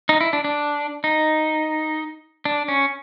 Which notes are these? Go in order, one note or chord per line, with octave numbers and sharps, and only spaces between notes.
D#4
E4
D4
D4
D#4
D4
C#4